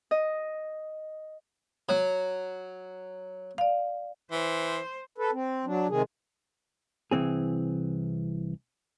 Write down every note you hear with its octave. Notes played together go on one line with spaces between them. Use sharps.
D#5
F#3
D5 F5
E3 C5
A4 B4
C4
F#3 D4
C3 D#3 G#3 G#4
C2 E3 C4 G#4